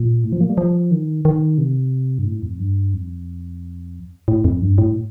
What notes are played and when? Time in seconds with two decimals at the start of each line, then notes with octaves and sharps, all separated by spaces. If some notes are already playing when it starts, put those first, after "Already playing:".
Already playing: A#2
0.24 A2
0.32 F3
0.41 A#3
0.49 G3
0.58 F3
0.91 D#3
1.25 D#3
1.58 C3
2.19 G2
2.26 A2
2.42 F2
2.59 G2
2.94 F2
4.28 A2
4.44 F2
4.62 G2
4.78 A2